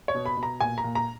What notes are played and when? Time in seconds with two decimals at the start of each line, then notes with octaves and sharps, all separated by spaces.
0.08 C#5
0.15 B2
0.26 B5
0.37 B2
0.43 A#5
0.60 A#2 G#5
0.78 A#5
0.84 A#2
0.95 A#5